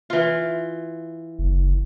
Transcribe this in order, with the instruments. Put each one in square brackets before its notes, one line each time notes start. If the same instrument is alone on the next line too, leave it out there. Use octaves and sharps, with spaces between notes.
[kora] E3 F4
[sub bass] F#1